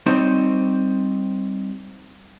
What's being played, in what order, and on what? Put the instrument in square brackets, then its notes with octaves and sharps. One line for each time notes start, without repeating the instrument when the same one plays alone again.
[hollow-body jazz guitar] G3 C4 D#4 C5 C#5